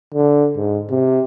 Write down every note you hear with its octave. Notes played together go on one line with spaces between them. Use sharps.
D3
G#2
C3